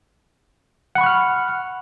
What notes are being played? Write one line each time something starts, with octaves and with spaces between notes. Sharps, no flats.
F#5 B5 C#6 F6 F#6